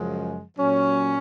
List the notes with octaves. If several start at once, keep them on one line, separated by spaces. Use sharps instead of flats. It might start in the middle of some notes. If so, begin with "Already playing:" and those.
Already playing: F#2 C#3 F3 G#3
A#2 F#3 C#4